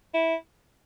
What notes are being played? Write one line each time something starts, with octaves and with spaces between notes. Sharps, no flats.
E4